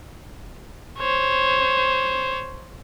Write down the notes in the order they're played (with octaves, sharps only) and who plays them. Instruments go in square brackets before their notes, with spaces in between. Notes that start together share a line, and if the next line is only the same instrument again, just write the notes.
[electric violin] C5 C#5